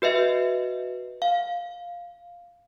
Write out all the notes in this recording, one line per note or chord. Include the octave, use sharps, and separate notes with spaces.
F#4 B4 D#5 E5
F5